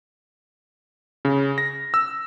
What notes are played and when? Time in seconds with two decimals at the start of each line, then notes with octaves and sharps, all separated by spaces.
1.25 C#3
1.58 A#6
1.94 E6